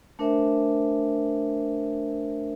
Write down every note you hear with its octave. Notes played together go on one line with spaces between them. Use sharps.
A3 D4 A#4 C5 E5 G#5